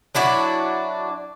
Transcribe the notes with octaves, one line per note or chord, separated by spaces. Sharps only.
F#3 D4 E4 F#4